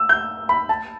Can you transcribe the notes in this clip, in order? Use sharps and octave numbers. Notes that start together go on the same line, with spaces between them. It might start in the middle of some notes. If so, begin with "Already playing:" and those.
Already playing: E6
G6
B5
A5